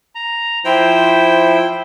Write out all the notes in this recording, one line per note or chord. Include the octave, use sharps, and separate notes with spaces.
A#5
F3 E4 C5 G5